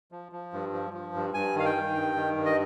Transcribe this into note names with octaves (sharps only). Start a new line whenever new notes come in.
F3
F3
G2
F3
F3
G2
G2 G#5
D#3 F5
G5
D#3
G2
D#3
G2
D#5